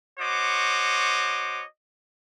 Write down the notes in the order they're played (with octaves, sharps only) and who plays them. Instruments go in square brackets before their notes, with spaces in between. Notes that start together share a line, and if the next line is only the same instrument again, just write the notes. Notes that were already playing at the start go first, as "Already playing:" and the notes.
[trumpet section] F#4 C5 C#5 D#5 D6